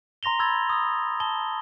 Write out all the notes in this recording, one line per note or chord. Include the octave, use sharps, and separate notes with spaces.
A#5 C6 A#6 F7 G7
B5 C6 E6 G#6 A6
D#6 E6
A5 G7